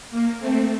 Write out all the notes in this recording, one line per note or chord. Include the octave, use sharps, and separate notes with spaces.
A#3
A3 C4